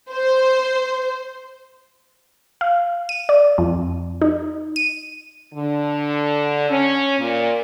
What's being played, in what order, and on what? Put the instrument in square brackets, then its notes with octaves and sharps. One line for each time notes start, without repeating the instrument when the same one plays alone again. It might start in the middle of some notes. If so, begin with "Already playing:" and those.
[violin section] C5
[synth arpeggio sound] F5
D#7
D5
F2
D#4
D#7
[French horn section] D3
C#4
A#2